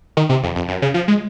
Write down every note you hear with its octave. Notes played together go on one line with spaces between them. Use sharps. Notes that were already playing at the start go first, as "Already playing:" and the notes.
D#3
C3
F2
F2
F#2
C#3
F3
G#3